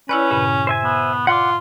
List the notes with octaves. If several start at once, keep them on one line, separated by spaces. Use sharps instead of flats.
C#4 E4 B4 C#5 D5
G2 A#2 C#3
C5 E5 G#5
B3
F4 D5 F#5 D6